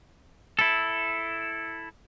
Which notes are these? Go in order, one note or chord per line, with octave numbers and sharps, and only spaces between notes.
E4 A4